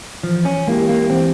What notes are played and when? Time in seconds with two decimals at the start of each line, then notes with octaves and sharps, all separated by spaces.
0.23 E3 F3
0.45 C#4
0.67 G#3 A#3 E4 G4
0.89 A#3
1.10 E3 C4